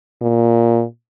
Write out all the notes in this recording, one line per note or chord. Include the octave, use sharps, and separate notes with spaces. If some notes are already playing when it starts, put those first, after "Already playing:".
A#2